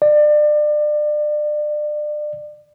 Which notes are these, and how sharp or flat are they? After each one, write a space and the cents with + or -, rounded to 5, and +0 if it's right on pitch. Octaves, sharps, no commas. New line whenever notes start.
D5 +30